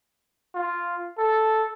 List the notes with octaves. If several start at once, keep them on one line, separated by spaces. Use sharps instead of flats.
F4
A4